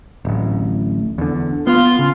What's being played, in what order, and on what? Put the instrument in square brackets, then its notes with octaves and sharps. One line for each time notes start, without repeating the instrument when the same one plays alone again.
[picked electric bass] D1 A1
E2 D3
[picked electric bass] B3 [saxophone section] F4
[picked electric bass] C#3